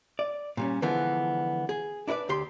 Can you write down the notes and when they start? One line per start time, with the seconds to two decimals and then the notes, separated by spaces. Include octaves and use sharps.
0.19 D5
0.57 A#2 G3 C#4
0.82 D3 E3 F3 G#3 B3
1.69 G#4
2.08 D4 E4 G#4 B4 D5
2.29 D2 G4 C6